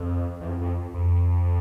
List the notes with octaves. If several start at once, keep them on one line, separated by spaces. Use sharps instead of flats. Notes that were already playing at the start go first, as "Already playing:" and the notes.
Already playing: F2
E2
F2
F2
F2